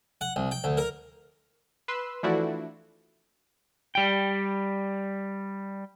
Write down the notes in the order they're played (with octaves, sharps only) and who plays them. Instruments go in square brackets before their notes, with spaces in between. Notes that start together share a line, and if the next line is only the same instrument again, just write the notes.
[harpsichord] F#5
C2
G5
D2
A#4
[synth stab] B4 C6 E6
E3 F3 A3 D4 E4 F#4
[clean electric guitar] G3 G5